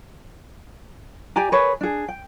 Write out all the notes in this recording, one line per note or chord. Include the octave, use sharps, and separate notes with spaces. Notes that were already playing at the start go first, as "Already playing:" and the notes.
G4 D5 G#5 A#5
G#4 A#4 B4 C#5
D4 G#4
G5